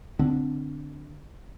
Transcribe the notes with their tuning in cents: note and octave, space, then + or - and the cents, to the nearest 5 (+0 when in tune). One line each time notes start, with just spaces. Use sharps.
D3 +0 C4 -25